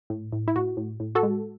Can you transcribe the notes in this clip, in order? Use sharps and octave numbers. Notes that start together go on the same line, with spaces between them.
A2
A2
E4
A2 F#4
A2
A2
F#4 A4
G#3